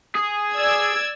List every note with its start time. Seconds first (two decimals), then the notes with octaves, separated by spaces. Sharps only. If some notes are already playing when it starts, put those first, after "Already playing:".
0.15 G#4
0.54 D5 E6 G#6